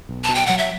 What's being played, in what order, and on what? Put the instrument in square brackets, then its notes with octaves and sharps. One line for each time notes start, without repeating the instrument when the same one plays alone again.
[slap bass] B1
[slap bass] B2 [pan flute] A5
[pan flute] G5
[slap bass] F#3 [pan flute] F#5
[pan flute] E5